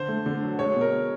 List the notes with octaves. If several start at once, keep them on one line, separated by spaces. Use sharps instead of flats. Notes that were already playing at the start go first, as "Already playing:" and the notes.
Already playing: D3 C5
A3
D3
F#3
G#3 C#5
B2
A#4